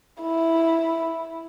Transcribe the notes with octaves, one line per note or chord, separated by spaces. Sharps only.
E4